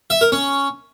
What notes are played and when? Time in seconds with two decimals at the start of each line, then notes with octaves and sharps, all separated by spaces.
0.10 E5
0.21 A#4
0.32 C#4